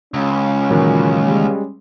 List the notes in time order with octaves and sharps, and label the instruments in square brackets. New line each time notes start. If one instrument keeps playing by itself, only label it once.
[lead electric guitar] C#2 [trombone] C#4
[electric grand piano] A#2 F#3 C#5 [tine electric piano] D#3 E3 A#3
[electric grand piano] G3 G#3